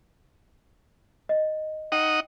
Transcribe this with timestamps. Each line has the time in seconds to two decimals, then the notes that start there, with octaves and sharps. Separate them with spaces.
1.29 D#5
1.92 D#4 D#5 F#5 G5